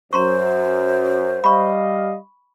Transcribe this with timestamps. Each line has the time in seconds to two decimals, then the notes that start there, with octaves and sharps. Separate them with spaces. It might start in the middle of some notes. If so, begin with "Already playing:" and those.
0.13 F#2 C5 A#5 C6 C#6
1.44 G3 D#5 F5 B5 C#6